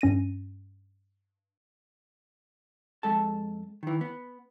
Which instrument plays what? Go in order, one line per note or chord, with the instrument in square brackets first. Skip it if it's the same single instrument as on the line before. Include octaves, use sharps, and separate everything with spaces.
[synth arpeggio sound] G2 C#4 A#6 D#7
[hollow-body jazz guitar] F2 G#3 A4 A5
D#3 E3
B3